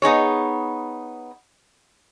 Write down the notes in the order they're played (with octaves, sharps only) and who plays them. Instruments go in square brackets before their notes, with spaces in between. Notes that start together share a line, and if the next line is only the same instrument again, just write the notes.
[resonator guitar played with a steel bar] B3 D#4 G#4 C#5